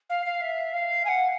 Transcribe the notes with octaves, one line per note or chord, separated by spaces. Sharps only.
F5
F5
E5
F5
G#5
F#5